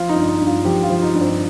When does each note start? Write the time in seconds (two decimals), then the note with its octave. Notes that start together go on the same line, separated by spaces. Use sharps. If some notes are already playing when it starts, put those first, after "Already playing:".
Already playing: F3 F4
0.09 D#4
0.15 G2
0.28 D#4
0.41 G2
0.47 F4
0.65 F3 G4
0.83 F4
0.90 F3
1.02 D#4
1.14 G2
1.21 C4